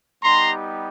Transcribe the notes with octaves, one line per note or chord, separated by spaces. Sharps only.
G3 B3 D#4 G4 A#5 C6